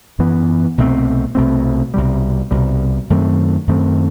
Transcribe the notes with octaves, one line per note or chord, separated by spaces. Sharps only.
F#2 E3 B3
C2 B2 A3 C4
C2 B2 A3 C4
C2 B2 G3
C2 B2 G3
F#2 D#3 A3 C4
F#2 D#3 A3 C4